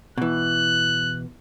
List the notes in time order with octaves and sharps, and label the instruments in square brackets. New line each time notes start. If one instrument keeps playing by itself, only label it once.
[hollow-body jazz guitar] B2 E3 [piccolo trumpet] F#6